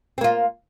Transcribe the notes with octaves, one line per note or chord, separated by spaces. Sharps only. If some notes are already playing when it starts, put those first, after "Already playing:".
A#3 C4 F4